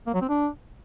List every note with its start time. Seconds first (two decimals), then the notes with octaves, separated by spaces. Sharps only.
0.07 A#3
0.14 F#3
0.22 C4
0.29 D4